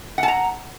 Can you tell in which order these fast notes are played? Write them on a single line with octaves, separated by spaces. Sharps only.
F#5 A5 A#5